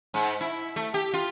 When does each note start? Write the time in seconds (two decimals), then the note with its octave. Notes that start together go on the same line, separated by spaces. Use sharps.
0.14 G#2
0.41 E4
0.76 A3
0.94 G4
1.13 F4